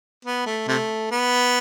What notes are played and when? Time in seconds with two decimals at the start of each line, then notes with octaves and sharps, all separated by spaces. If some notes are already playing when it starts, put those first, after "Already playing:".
0.25 B3
0.46 A3
0.68 C3 A3
1.11 B3